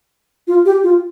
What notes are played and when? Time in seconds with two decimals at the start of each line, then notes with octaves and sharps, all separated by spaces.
0.47 F4
0.66 G4
0.83 F4